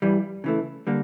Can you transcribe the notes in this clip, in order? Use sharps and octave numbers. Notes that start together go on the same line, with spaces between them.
G2 E3 G3
C#3 E3 A3
D3 G3 A#3